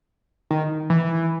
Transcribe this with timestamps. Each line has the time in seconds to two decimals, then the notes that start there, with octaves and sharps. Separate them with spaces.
0.51 D#3
0.90 E3